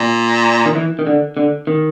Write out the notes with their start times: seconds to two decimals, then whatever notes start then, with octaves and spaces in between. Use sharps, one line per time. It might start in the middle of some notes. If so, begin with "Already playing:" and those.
Already playing: A#2
0.66 D#3
0.75 E3
0.99 D#3
1.07 D3
1.37 D3
1.67 D#3